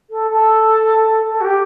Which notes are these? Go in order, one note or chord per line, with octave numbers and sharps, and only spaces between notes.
A4
A4
A4
F#4
G4